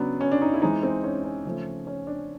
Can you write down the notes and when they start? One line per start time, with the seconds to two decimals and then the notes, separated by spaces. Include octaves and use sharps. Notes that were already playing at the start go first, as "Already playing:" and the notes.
Already playing: C#3 F#3 B3 D4
0.21 C#4
0.32 D4
0.42 D#4
0.54 E4
0.62 E3 G#3 C4 D#4
0.83 C4
1.04 C#4
1.24 C#4
1.45 C#3 F3 A3
1.87 C#4
2.07 D4